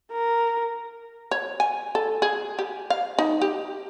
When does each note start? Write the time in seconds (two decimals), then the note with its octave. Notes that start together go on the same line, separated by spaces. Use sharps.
0.12 A#4
1.31 C#5
1.60 G#5
1.95 A4
2.22 G#4
2.59 G4
2.90 F5
3.19 D#4
3.42 G4